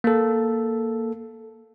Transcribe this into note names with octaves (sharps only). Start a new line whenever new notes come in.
A#3 A4